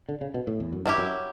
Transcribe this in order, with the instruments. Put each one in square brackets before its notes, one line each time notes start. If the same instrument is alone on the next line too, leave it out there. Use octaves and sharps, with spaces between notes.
[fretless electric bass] D3
C#3
B2
A2
E2
F#2
[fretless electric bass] G2 [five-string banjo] F#3 C#4 E4 G4
[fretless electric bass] F#2